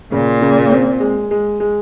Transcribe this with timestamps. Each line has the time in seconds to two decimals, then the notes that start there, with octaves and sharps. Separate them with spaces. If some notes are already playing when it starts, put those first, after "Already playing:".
0.12 A#2 C#3
0.42 C#3
0.72 C4
1.00 G#3
1.31 G#3
1.60 G#3